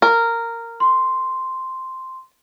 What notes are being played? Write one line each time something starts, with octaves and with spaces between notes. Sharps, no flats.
A#4
C6